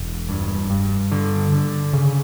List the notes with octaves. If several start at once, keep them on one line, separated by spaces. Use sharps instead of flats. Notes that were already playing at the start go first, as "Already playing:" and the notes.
Already playing: E1
G2
G2
D3
D3
C#3